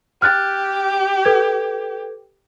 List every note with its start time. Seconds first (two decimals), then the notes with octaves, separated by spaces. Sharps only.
0.22 G4 F6 F#6 A6
1.25 A4 B4 G#6